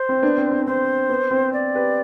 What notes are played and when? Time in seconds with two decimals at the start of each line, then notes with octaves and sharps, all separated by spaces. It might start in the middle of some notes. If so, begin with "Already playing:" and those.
Already playing: C5
0.09 C4
0.22 B3 D4
0.38 C4
0.51 C4
0.60 D4
0.66 C4 C5
1.09 B3
1.31 C4
1.53 D5
1.75 G4 B4